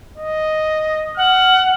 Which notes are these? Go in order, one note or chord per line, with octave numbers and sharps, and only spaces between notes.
D#5
F#5 F6